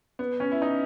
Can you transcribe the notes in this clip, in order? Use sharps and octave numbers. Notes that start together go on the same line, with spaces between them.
B3
C#4
E4
D#4